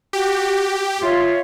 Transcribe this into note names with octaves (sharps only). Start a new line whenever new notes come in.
F#4 G4
F4 C#5 E5 C6